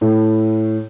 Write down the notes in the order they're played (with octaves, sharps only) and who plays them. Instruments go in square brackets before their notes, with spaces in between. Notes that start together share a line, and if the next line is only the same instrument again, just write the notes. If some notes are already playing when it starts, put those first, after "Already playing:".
[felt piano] A2